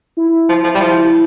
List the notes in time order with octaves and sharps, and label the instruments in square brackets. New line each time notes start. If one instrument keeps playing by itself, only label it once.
[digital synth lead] E4
[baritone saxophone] F3
F3
G3
F3